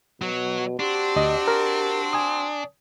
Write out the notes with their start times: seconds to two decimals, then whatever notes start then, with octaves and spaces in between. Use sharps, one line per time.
0.22 B2 F#3
0.80 C4 D4 F#4 G4 C6
1.16 D2 D#5
1.48 A#4
2.13 G#5 D#6